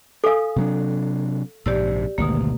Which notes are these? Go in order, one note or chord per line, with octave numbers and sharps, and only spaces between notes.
A4 F5 G#5 D#6 E6
C3 F#3 D4
A#1 G#2 C3 G4 D5 E6
G#1 D2 B2 A#3